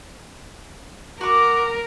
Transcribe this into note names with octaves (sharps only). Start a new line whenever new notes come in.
F#4 A#4 D6